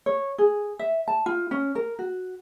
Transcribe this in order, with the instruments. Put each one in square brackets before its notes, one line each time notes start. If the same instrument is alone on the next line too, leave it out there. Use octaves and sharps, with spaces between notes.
[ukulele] C#5
G#4
E5
A5
F4
C#4
A#4
F#4